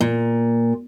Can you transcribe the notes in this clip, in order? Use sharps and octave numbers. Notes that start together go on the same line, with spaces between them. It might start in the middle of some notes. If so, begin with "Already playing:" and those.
A#2